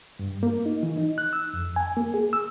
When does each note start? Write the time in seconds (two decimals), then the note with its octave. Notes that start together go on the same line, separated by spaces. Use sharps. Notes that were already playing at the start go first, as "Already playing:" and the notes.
0.19 G2
0.43 A#3
0.66 D#4
0.83 E3
0.97 D#4
1.18 F#6
1.33 E6
1.54 F2
1.76 G#5
1.97 A#3
2.14 G#4
2.33 E6